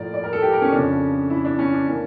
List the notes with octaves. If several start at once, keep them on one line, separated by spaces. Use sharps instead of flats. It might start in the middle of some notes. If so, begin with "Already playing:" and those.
Already playing: A2 F3 A#3 A#4 D5
D5
A#4
A4
G4
A#4
C#4
F2 C#3 F3 C#4 D4
E4
D4
C#4
D4
E3 A#3 C#4